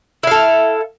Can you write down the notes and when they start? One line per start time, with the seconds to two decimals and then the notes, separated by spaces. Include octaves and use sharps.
0.23 E4
0.27 F5
0.31 A4